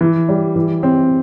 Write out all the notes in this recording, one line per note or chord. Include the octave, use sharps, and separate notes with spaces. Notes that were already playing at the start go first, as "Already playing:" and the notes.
E3
G3
E3
C4